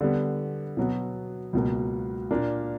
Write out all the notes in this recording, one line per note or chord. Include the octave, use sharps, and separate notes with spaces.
D3 G3 B3
B2 F#3 B3
C#2 B2 F#3 A#3
A#2 A#3 D4